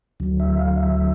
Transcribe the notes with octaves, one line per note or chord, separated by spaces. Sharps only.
D2 D3 F#3
E5
F5
E5